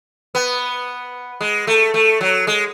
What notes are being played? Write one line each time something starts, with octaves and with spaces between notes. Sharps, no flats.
B3
G#3
A3
A3
F#3
G#3